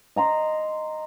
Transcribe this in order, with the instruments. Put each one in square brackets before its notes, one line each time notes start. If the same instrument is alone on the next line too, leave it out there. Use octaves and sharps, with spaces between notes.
[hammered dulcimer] D#5 A#5 C6